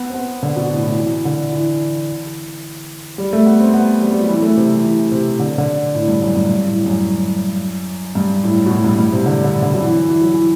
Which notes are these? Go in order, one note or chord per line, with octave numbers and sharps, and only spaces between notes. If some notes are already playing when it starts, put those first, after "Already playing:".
Already playing: B3
C4
B3
D3
B2
A2
A2
E3
D3
E3
G3
A3
B3
C4
B3
G3
G3
F#3
E3
A3
C3
E3
E3
C3
D3
D3
A2
G2
F#2
G2
G2
A2
F#2
G2
A2
B2
A2
G2
G2
C3
D3
D3
D3
F#3
E3
E3
F#3
E3